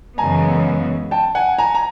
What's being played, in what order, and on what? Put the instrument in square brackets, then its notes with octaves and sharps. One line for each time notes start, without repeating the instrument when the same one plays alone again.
[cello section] F#2 C#3 E3 G#3 B3 [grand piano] G#5 A#5
[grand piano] G5 A5
F#5 G#5
G#5 A#5
A#5